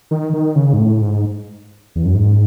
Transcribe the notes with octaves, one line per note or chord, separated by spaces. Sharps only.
D#3
D#3
C#3
G#2
A2
G#2
E2
F#2
G#2